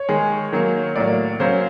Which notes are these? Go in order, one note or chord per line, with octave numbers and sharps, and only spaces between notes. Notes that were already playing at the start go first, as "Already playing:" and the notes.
Already playing: C#5
D#3 G#3
D#3 F#3 A#3
A2 F#3 A#3 D5
C#3 F#3 A#3 C5